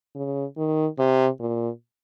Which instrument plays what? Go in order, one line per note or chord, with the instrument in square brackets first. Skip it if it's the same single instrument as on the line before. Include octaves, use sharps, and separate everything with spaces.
[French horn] C#3
D#3
C3
A#2